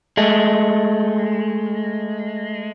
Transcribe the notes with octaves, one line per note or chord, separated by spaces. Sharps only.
G#3 A3